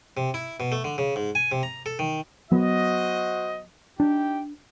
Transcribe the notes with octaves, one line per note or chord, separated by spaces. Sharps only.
C3
E4
B2
A3
D3
C#3
G#2
G#5
C3
A#5
A4
D#3
F#3 B3 F#4 C5 D#5
D4 D#4 G4 G5